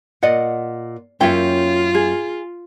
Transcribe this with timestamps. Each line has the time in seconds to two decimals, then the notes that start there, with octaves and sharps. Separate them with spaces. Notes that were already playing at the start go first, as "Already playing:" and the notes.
0.23 A#2 D5 D#5 F#5
1.21 F#2 A#3 C#4 F4 C#5 E5 G5
1.95 G#4